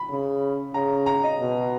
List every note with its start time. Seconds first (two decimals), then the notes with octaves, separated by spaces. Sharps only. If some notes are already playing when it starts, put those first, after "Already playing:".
Already playing: B5
0.09 C#3
0.74 C#3 A#5
1.06 A#5
1.23 D#5
1.40 B2